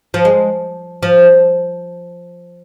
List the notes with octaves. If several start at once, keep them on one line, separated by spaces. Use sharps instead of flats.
F3
G#3
F3